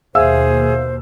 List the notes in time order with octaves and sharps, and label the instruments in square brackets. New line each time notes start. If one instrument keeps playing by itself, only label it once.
[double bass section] D#2 B2 [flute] G#4 [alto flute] C5 [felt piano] E5 F5 E6